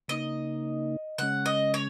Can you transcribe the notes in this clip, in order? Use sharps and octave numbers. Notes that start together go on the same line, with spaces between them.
C#3 A#3 D#4 D#5
C#3 G#3 C#4 F#5
D#5
C#5